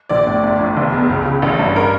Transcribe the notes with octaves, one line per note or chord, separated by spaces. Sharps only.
A#1 D5
A2
G1
F2
F1
E2
C#2
C#3
A1
G2
A#4